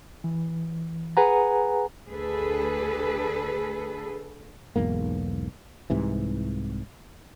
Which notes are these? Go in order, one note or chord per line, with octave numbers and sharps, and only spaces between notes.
E3
G#4 B4 F#5 G#5 A#5
D2 G#4 A4 B4
B1 E2 G#2 A#3
C2 G#2 C3 E3